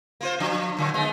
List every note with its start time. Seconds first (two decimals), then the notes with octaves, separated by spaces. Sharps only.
0.21 A#3 F4 C5
0.40 F3 D4
0.77 A#2 D3 F#3
0.94 G#3 B3 D#4